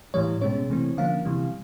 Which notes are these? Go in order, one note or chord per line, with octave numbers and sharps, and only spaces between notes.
A2 E3 G3 C#5
B2 G#3 C#4 C#5
C3 E3 A3 C4
D3 F3 A#3 C#4 F5
C3 E3 G3